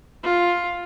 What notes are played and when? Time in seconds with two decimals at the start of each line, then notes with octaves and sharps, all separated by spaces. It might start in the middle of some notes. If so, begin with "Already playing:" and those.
0.23 F4